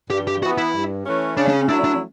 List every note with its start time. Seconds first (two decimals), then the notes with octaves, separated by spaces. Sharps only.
0.10 G2 G4
0.27 G4
0.42 E3 F#4
0.46 B3
0.58 E4
0.74 G2
1.06 E3 A3 C#4
1.37 C#3 D4
1.48 D4
1.53 C#4
1.68 F#3 A3 D4 E4
1.84 D4